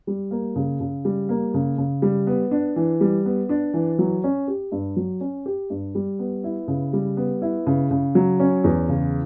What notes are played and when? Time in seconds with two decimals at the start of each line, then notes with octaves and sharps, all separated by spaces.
0.07 G3
0.31 A#3
0.56 C#3
0.80 C#3
1.05 G3
1.29 A#3
1.54 C#3
1.78 C#3
2.02 G3
2.27 B3
2.51 D4
2.76 E3
3.01 G3
3.25 B3
3.49 D4
3.74 E3
3.99 F#3
4.24 C#4
4.48 G4
4.72 G2
4.96 F#3
5.21 C#4
5.46 G4
5.70 G2
5.95 G3
6.19 B3
6.44 E4
6.68 C#3
6.93 G3
7.17 B3
7.42 E4
7.66 C#3
7.91 C#3
8.15 F#3
8.40 C#4
8.64 E2
8.89 C#3